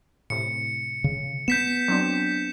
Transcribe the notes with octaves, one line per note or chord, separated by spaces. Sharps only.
A2 C3 C#7
C#3
B3 G6 B6 E7
F#3 C4 D4